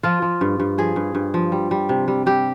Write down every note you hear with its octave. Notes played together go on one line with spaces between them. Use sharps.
F3 F4
F3
G2
G2
F3 G#4
G2
G2
F3
G3
G3
C3
G3
G3 G4